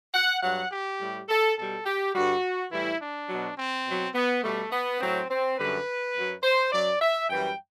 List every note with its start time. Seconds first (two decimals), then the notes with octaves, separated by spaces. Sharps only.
0.14 F#5
0.42 G2 F#3 F#5
0.71 G4
0.99 A2 G3
1.29 A4
1.57 B2 G3 A4
1.85 G4
2.14 G2 D3 G3 F#4
2.71 A2 E3 G3 E4
3.00 D4
3.29 B2 F#3
3.58 C4
3.86 B2 F#3
4.15 B3
4.43 B2 G3 A3
4.72 B3
5.01 A2 F#3 C4
5.29 C4
5.58 F#2 D3 G3 B4
6.15 F#2 F#3
6.43 C5
6.72 F#2 F#3 D5
7.01 E5
7.29 F#2 E3 G3 G5